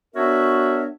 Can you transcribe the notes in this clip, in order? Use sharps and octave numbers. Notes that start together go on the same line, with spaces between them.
B3 D4 F#4 A#4 C#5 E5